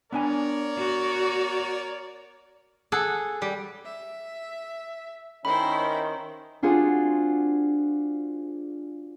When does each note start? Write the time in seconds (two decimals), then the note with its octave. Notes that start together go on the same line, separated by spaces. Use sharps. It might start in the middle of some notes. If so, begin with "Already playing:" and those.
0.12 B3 D4 A#4 C#5 D5 G#5
0.78 F#4
2.92 G#4 A4 F#5
3.42 G3
3.85 E5
5.45 D#3 C#4 E4 C5 B5
6.62 D4 F4 F#4 G#4 C5